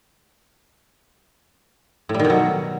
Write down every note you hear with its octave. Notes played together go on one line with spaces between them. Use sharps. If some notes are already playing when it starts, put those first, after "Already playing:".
A2
G3
D#3
B2
F#3